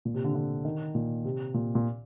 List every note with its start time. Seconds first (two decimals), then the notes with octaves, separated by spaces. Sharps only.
0.05 A#2
0.14 C3
0.24 D3
0.35 D3
0.65 D#3
0.95 A#2
1.25 C3
1.54 A#2
1.75 A#2